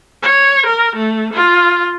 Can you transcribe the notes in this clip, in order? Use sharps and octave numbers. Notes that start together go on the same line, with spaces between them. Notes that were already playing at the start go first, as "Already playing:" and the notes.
C#5
A#4
A3
F4